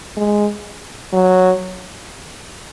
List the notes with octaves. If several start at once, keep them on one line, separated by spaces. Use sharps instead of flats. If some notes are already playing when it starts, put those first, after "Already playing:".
G#3
F#3